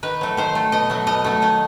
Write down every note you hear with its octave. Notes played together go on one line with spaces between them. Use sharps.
D#3 B4
F#3 A3
D#3 C5
A3
B2 D#5
F#3 A3
B2 D#5
F#3 A3
D#3 D#5